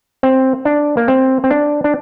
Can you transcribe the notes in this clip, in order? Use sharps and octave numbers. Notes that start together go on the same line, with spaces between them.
C4
D4
A#3
C4
C4
D4
D4